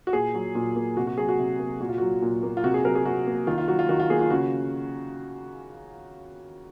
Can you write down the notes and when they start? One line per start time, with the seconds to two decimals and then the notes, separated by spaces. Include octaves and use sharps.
0.07 F#4
0.13 A#2 G#4
0.34 F#3
0.55 A#2
0.76 A#3
0.97 C3 F#4
1.07 F#4
1.17 F#3 G#4
1.29 F#4
1.39 C3
1.59 A#3
1.80 A#2 F#4
1.89 F4
1.98 F#3 F#4
2.22 A#2
2.43 A#3
2.57 F4
2.64 C3 F#4
2.74 G#4
2.85 F#3 A#4
2.95 G#4
3.05 C3 F#4
3.26 A#3
3.47 D#3 F4
3.58 F4
3.68 F#3 F#4
3.79 F4
3.89 D#3 F#4
4.00 F4
4.10 A#3 G#4
4.20 F4
4.30 C#3 F#4